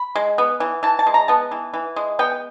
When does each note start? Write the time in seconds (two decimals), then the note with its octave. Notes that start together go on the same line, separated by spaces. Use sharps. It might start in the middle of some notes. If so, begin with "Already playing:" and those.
Already playing: B5
0.15 G#3
0.38 B3
0.60 E3
0.83 E3 A5
0.99 A5
1.07 G#3
1.14 A#5
1.28 B3 A5
1.51 E3
1.74 E3
1.96 G#3
2.19 B3 G5